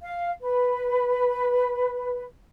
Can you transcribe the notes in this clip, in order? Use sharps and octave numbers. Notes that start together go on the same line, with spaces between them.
F5
B4